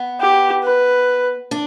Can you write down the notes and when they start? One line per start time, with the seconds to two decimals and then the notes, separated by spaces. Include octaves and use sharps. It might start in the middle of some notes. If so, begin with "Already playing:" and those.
Already playing: B3
0.20 G4
0.63 B4
1.51 D4